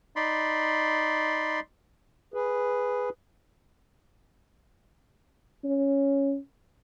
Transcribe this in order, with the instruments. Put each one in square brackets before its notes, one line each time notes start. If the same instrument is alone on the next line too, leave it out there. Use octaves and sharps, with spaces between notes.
[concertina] D#4 D5 B5 C6
[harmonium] G#4 B4
[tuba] C#4